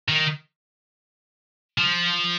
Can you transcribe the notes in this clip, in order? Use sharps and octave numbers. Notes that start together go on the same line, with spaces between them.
D#3
F3